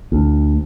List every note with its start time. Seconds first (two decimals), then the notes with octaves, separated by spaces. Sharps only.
0.12 D2